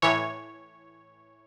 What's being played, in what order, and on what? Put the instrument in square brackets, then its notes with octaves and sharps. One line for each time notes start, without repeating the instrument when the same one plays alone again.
[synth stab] A2 E3 C#5